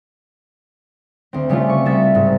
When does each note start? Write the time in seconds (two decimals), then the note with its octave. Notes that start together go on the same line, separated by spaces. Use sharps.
1.33 D2 C4
1.49 C#3 G3 A3 F4
1.69 C#6
1.85 C2 E5 A6
2.15 G#2